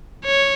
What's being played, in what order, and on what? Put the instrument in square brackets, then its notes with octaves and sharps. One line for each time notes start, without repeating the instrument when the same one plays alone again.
[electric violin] C#5